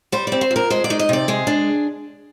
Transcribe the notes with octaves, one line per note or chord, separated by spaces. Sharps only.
G3 C5
C4 D5
C5
F2
A#4
G#3 C5
D5
D#4
D#5
C3 D5
G#3 G#4
D4